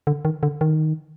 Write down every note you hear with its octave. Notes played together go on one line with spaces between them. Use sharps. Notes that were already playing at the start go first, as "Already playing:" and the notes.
D3
D#3
D3
D#3